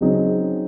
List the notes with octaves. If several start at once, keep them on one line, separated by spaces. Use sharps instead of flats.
C#3 F#3 C4 D#4